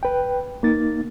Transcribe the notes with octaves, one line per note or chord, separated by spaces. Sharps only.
B4 G5
A#3 D#4 A6